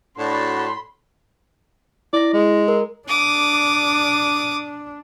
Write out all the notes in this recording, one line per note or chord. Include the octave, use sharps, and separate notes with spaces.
A2 D4 F#4 A5 B5 C6
E4 D5 A#6
G#3
A#4
D4 D6 D#6